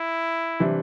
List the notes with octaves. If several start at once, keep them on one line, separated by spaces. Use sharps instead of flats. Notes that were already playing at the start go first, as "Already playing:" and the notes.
Already playing: E4
C3 E3 G3 D4